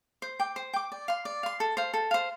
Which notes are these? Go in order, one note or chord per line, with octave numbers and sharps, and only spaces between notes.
C5
G5 D6
C5
G5 D6
D5
F5 C6
D5
F5 C6
A4
C5 F5
A4
C5 F5